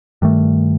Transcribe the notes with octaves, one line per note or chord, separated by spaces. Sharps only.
G2 D#3 A3